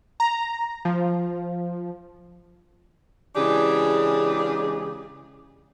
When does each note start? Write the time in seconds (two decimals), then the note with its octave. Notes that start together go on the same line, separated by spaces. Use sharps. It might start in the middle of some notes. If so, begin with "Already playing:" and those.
0.20 A#5
0.85 F3
3.36 C#3 E3 G#3 D4 G4 G#4